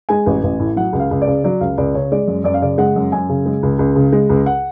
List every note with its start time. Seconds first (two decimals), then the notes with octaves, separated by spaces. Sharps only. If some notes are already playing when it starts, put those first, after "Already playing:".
0.09 G#3 G#5
0.26 A1
0.43 A1
0.59 A2
0.76 F#3 F#5
0.93 C#2
1.00 F5
1.11 C#2
1.22 D5
1.27 C#3
1.44 F#3 D5
1.61 C#2 F5
1.78 C#2 D5
1.94 C#3 C#5
2.12 G#3 D5
2.28 F#2
2.44 F#2 D5
2.54 F5
2.62 C#3 D5
2.78 G#3 F#5
2.96 F#2
3.12 F#2 G#5
3.29 C#3
3.46 G#3
3.63 C#2
3.79 C#2
3.96 C#3
4.12 G#3
4.29 C#2
4.46 F#5